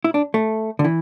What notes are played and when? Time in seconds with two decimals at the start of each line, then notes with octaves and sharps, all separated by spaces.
0.04 E4
0.14 D4
0.34 A3
0.79 D3
0.84 E3